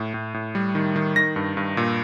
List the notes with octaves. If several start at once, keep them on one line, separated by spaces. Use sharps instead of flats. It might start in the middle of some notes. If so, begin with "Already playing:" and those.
Already playing: A2
A2
A2
G3
D#3
D#3
D#3 A#6
G2
G2
A#2